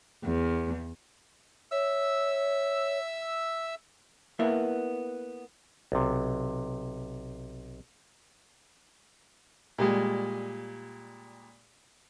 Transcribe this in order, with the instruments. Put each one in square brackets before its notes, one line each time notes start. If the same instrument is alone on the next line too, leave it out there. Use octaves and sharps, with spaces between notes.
[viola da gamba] E2
[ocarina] C#5 [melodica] E5 E6
[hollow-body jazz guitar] A#3 B3 E4 E5
[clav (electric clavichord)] B1 C3
[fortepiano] A#2 G3 G#3